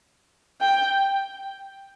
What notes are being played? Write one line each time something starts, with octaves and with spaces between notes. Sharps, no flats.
G5